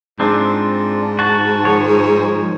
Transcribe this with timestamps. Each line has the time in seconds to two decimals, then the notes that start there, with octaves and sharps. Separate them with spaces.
0.20 G#2 C4 D4 F4
1.19 F#4 A5
1.64 D#3 F3 C#5